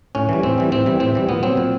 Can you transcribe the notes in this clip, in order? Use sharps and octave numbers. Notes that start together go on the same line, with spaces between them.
A2 C#4
E3 G3
A2 C4
E3 G3
A2 C4
E3 G3
A2 C4
E3 G3
A#2 B3
F#3 C4
A#2